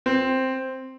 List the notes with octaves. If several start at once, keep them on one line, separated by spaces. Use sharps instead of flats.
C4